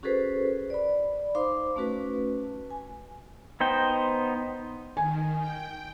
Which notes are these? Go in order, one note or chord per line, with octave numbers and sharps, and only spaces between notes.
C#4 F#4 G#4 A4 B4 C5
D5 B5
D#4 C5 F5 C6 D6
A3 C#4 F#4 B4
G#5
B3 D#4 C5 G5
D#3 G#5
G5